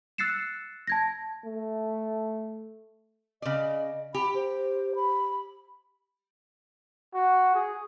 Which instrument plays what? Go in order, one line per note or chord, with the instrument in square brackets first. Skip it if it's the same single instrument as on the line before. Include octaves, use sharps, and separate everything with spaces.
[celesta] E6 F#6 A6 C7 C#7 E7
A5 G#6 A#6
[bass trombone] A3
[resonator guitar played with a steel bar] C#3 D5 [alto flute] D#5
[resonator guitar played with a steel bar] G4 [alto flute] B5
[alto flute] C5
B5
[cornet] F#4
G#4